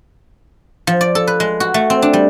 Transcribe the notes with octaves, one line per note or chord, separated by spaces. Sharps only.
F3
D5
A4
B4
G#3
F#4
A3
C4
D4
G3